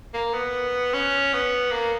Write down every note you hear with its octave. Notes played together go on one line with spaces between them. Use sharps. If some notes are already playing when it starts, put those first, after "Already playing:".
A#3
B3
C#4
B3
A#3